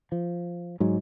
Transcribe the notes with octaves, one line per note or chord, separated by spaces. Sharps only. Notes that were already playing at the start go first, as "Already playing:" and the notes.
F3
G#2 F#3 G#3